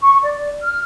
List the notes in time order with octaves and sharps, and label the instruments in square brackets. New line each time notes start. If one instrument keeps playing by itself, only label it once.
[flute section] C#6
D5
F6